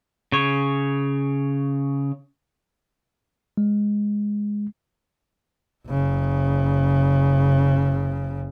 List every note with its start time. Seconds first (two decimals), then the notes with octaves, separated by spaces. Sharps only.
0.32 C#3 C#5
3.58 G#3
5.87 F#1 C#3